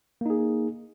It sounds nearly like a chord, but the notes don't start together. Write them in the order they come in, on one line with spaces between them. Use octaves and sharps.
A#3 D#4 G#4